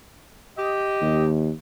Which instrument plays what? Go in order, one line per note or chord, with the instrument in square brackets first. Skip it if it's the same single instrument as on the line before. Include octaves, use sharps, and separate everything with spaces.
[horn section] G4 D#5
[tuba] D#2